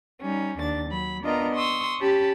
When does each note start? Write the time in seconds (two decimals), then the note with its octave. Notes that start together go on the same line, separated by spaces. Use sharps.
0.21 G3 C#4 D#4
0.58 D#2 D4 A6
0.90 F#3 B5
1.23 B3 D4 F4 A#4 D#5 A#5
1.55 C6 C#6 D#6 E6
2.00 C#4 G4 A5 B5